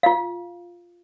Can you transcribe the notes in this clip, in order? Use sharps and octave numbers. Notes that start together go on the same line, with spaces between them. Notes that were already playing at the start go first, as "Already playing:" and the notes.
F4 F5